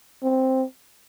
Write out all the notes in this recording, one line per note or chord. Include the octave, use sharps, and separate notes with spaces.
C4